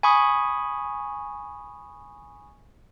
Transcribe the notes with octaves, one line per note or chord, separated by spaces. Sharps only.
G#5 B5 C#6 D#6